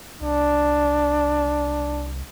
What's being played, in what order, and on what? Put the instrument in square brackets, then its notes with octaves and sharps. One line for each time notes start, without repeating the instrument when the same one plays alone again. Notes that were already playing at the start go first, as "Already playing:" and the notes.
[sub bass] C2 [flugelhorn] D4